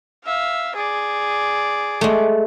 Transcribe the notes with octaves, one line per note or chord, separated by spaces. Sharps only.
E5 F5
G#4 D5
G#3 A3